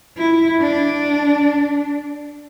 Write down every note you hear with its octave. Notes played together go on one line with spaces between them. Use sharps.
E4
D4